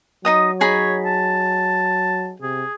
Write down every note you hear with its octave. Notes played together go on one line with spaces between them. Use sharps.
F#3 D#4 D#5 D#6
D#4 G#4 C#5 B5
A5
C3 G#4